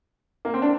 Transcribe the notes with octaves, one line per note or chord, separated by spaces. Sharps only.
A#3
C4
D4